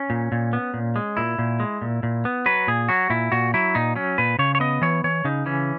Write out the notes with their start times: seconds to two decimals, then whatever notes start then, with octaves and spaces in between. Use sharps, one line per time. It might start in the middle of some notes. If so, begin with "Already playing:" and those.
Already playing: C#4
0.10 A#2
0.32 A#2
0.53 B3
0.74 A#2
0.96 G#3
1.17 A#2 E4
1.39 A#2
1.60 G#3
1.82 A#2
2.03 A#2
2.25 B3
2.46 F#3 B4
2.68 A#2 G#4
2.89 F#3 F#4
3.10 A#2 E4
3.32 A#2 F#4
3.54 F#3 E4
3.75 A#2 D#4
3.95 F#3 C#4
4.18 A#2 B4
4.39 C#3 C#5
4.55 C#5
4.60 B3 D#5
4.82 E3 C#5
5.04 E3 C#5
5.25 C#3 D#4
5.46 E3 C#4